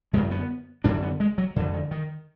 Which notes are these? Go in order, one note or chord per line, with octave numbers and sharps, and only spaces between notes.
F#2 D3 G#3
B3
F#2 D3 D4
B3
G#3
F#3
F2 D3
D#3
D#3